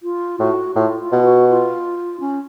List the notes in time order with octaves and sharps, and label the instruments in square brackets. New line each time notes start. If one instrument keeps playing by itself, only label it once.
[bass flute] F4
[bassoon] A2 [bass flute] F#4
[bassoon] A2 [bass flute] F4
[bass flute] F4
[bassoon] B2
[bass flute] F#4
F4
C#4